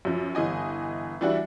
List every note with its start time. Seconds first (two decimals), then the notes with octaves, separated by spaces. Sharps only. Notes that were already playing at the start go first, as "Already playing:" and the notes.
0.05 F#2 F3
0.35 G1 E3 D#5 G#5
1.21 E3 G3 D4 E4 F#4